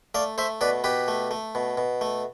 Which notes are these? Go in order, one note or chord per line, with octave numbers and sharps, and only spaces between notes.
A3 D5 F5
A3 C5 E5
B2 B4 D5
B2 G4 B4
A3
A3
B2
B2
A3